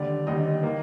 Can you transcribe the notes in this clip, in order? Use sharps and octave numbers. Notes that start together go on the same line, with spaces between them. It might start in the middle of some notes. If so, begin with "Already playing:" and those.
Already playing: D#2 D3 G3 D5
D#2 D3 G3 D#5
D#3 A#3